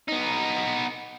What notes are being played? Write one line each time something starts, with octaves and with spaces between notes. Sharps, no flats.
B3 D#4